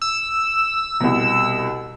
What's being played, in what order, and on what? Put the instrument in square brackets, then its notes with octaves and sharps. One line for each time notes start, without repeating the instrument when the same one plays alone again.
[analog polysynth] E6
[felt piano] C2 B2